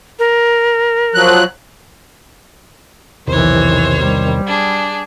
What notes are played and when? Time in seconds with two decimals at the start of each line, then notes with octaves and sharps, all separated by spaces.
0.19 A#4
1.14 F3 F#3 F#6
3.28 B1 E2 C3 D#3 E3 C5 C#5
3.99 G3
4.47 D4 G#4